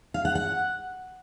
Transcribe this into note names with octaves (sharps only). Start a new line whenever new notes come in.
F5
F#5
F#5